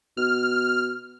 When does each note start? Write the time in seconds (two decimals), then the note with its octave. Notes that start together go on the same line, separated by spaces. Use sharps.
0.17 B2 F6